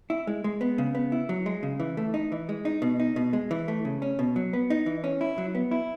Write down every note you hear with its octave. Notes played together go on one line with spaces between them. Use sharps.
E4
G#3
G#3
B3
C#3
B3
E4
F#3
G#3
C#3
E3
A3
D#4
E3
G#3
D#4
B2
D#4
B2
G#3
E3
A3
C#3
C#4
B2
F#3
B3
D#4
E3
C#4
E4
F#3
B3
E4